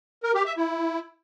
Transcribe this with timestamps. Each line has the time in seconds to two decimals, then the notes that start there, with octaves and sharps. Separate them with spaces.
0.23 A#4
0.34 G4
0.46 E5
0.57 E4